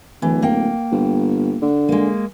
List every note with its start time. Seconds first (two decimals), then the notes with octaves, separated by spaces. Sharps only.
0.22 D1 E3
0.42 A#3 G5
0.92 G1
1.62 D3
1.89 G#3 A#3